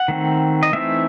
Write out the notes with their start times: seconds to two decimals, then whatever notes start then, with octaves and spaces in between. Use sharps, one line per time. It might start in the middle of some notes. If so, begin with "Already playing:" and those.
Already playing: F#5
0.08 D#3 A3 C4
0.63 D#5
0.73 E3 A3 C4 D#4 E5